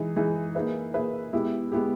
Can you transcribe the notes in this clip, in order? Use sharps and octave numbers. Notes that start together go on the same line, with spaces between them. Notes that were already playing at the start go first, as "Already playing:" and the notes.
Already playing: E3 G#3 D#4 G#4
E3 G#3 D#4 G#4
A#3 D#4 G#4 B4 E5
A#3 D#4 G#4 B4 E5
G#3 B3 E4 G4
G#3 B3 E4 G4